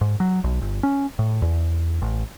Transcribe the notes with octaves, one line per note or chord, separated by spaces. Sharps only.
G#2
F#3
B1
G1
C#4
A2
E2
A1